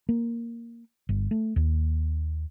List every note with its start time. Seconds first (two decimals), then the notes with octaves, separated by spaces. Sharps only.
0.09 A#3
1.09 G1
1.31 A3
1.56 D#2